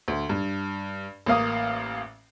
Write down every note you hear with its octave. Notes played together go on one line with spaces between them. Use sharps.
D2
G2
A1 A#3 F5 D#6